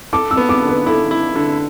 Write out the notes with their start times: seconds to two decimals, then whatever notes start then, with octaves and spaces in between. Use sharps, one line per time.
0.13 A4 D6
0.31 E6
0.37 B3
0.49 D6
0.62 D3
0.69 B4
0.86 E4 A4
1.11 E4
1.36 D3